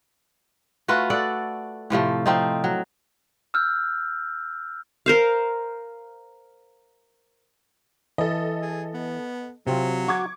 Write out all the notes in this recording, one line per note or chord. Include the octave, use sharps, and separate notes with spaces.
A3 F4 F#4 B4
A4 D5 F#5
A2 C3 F3 A3
F3 C4 D#4
F#3
E6 F6 G6
A#4 C5 F5
E3 A4 D#5
G#4
B3
C3 F#3 C4 F4
F#4 C#6 D6 G#6